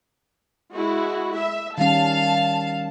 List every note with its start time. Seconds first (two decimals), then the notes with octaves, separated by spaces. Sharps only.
0.74 G#3 E4 F#4
1.36 E5
1.78 D#3 G3 C#4 F5 A5